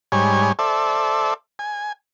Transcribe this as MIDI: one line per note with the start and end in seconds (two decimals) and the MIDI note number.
0.12 0.52 44
0.12 0.52 55
0.12 0.52 73
0.12 0.52 80
0.59 1.34 69
0.59 1.34 72
0.59 1.34 74
0.59 1.34 76
1.59 1.92 80